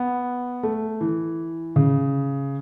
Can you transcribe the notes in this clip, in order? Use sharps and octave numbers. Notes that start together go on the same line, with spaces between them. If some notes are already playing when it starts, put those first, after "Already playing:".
Already playing: B3
A3
E3
C#3